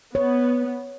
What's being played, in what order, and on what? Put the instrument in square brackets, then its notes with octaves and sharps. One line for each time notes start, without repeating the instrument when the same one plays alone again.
[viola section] B3 [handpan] C#5